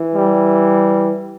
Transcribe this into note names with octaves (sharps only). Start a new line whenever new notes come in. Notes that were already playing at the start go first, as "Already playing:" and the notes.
Already playing: E3
G3